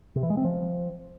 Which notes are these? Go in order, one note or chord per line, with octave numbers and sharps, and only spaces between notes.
C3
E3
G#3
C4
F3